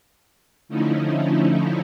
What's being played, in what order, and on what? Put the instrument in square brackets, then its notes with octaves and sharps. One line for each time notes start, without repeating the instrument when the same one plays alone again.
[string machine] D3 F3 A3 C#4 D#4 E4